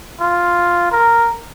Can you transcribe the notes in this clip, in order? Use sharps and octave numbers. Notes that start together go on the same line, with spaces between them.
F4
A#4